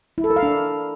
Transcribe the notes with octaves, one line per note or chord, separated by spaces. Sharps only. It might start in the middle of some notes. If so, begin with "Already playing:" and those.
E4
A4
A#4
F5
D4